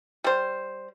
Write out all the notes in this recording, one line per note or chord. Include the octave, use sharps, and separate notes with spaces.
G3 C5